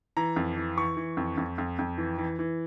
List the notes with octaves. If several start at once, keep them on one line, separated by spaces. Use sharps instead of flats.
E3 A#5
F2
E3
E3 C#6
E3
F2
F2
F2
F2
E3
E3
E3